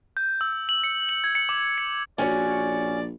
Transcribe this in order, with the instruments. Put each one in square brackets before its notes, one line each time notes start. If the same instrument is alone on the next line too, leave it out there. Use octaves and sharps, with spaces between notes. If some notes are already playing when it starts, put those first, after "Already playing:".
[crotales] G6
E6
G6
F#7
C#7
F#7
G#6
C#7
D6
C#7
[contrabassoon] A#1 [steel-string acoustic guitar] C#4 F#4 C#5 [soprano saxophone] D5